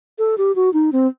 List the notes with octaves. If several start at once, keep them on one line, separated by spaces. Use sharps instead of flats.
A4
G4
F#4
D#4
C4